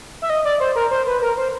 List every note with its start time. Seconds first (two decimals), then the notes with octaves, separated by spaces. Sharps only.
0.22 E5
0.30 D#5
0.45 D5
0.60 C5
0.75 A#4
0.91 C5
1.07 B4
1.22 A#4
1.37 C5